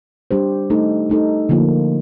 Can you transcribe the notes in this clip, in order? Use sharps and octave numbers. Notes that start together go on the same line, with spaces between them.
G3 D4 G4 C5
A3 D#4 A4
A3 D#4 A4
D3 F3 A#3 D4 F4